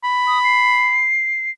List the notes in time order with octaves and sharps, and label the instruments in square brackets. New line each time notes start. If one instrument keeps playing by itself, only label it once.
[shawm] B5
[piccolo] D#6
C7